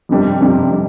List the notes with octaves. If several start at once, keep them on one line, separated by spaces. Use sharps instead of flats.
F2 C3 G3 D4
F2 C3 G3 D4
C3 G3 D4